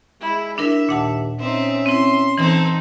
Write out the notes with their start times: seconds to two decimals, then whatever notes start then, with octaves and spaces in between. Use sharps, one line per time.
0.21 G#3 E4
0.58 D4 E4 A#4 E5
0.89 D#2 A#2 F#5 A5
1.39 C4 C#4 D#4 E5
1.86 C4 E4 C6
2.38 E3 C4 D#4 A4 C6